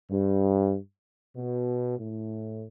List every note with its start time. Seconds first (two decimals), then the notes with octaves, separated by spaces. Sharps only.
0.10 G2
1.36 B2
1.99 A2